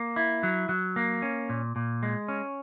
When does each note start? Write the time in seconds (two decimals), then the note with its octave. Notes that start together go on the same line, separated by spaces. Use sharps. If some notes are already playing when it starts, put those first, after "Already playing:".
Already playing: A#3
0.16 E4
0.43 F#3
0.69 F#3
0.96 A#3
1.22 C#4
1.49 A#2
1.76 A#2
2.03 G#3
2.28 C#4